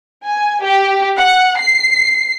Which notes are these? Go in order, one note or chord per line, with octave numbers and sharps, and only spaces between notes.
G#5
G4
F#5
C7